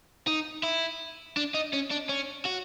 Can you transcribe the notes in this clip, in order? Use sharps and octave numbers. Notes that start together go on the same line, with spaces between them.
D#4
E4
D4
D#4
C#4
D4
C#4
F#4